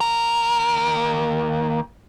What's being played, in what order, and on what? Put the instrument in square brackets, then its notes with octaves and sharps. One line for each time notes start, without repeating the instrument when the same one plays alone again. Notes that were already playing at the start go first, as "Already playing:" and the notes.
[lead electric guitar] D#2 A#4